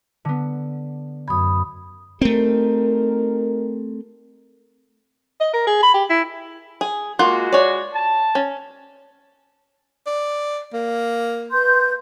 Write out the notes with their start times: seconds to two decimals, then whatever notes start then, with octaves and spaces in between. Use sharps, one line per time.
0.25 D3 B3
1.28 F#2 B5 D#6 G#6
2.21 A3 C4 D#4 G4 A#4
5.41 D#5
5.53 A#4
5.67 G#4
5.83 B5
5.94 G4
6.10 E4
6.81 G#4
7.19 G#3 A#3 F4 F#4 F#5
7.53 C#5 D5
7.94 A5
8.35 C#4
10.06 D5
10.73 A#3
11.51 B4 C6 G6